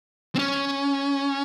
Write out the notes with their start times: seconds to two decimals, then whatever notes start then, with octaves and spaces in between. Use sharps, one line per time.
0.35 C4
0.39 C#4